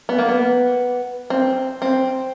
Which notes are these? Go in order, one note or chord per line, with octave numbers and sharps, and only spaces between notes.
B3
A#3
B3
C4
C4